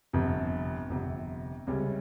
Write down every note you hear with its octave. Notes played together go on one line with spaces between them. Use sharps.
G1 F2 C3
G1 F2 C3
C#2 C3 G3 C#4